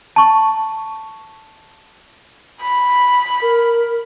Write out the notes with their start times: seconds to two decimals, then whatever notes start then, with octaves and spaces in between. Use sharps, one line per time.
0.16 A5 C#6
2.61 B5
3.42 A#4